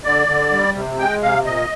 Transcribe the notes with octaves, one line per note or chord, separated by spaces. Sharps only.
D3 D5
D3
G3
C3
G#3 G5
C3 F5
A#2 D#5